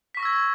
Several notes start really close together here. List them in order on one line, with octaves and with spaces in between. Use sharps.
B6 C#6 A#6 E6 G#6